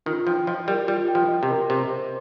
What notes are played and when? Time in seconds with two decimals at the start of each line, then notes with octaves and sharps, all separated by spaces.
0.06 D#3 F4
0.27 F3 G5
0.47 F3 D#5
0.67 G3 A#4
0.88 G3 F4
1.08 G5
1.15 F3
1.28 D#5
1.43 C3
1.49 A#4
1.70 C3 C5
1.90 C5